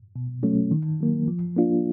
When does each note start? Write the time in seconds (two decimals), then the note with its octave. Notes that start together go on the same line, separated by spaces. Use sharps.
0.16 B2
0.43 F#3 A3 C#4
0.71 D#3
1.00 F#3 A#3
1.28 F3
1.57 A#3 D4 F4